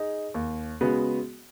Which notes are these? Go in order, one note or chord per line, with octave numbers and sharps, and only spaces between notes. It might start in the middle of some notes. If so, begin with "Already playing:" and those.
Already playing: D#4 G#4
D#2
C#3 G#3 B3 F#4